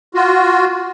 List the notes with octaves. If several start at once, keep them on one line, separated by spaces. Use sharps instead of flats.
F4 F#4